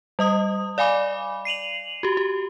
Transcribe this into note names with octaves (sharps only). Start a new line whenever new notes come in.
G3 D#5 D#6
D5 F5 G#5 B5 D6
C7 D#7 F7 F#7
F#4 G4
G4